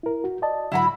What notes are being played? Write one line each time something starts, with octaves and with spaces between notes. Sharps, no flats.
E4 A#4
F#4
D5 D#5 A5
G#2 D3 F#3 E4 F#4 B5